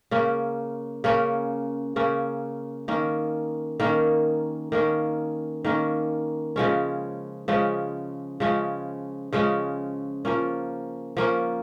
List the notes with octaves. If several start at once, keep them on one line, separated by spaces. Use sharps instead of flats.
C#3 A#3 C#4
C#3 A#3 C#4
C#3 A#3 C#4
D#3 A#3 C#4
D#3 A#3 C#4
D#3 A#3 C#4
D#3 A#3 C#4
C#3 F3 G#3 C#4
C#3 F3 G#3 C#4
C#3 F3 G#3 C#4
C#3 F3 G#3 C#4
F3 A#3 C#4
F3 A#3 C#4